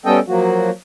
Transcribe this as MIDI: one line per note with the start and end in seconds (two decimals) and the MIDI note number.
0.06 0.19 55
0.06 0.19 59
0.06 0.19 61
0.06 0.19 69
0.06 0.19 75
0.06 0.19 79
0.28 0.70 53
0.28 0.70 54
0.28 0.70 58
0.28 0.70 66